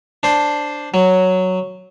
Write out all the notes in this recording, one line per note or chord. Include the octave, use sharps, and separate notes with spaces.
D4 C5
F#3